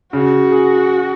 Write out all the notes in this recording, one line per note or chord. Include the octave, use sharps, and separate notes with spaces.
C#3 F#4
G#4